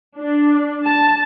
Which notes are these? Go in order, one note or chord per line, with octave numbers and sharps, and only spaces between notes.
D4
A5